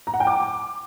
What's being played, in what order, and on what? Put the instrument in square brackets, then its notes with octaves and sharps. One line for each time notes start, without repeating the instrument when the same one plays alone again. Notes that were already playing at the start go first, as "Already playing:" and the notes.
[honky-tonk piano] A#5
F#5
G5
D6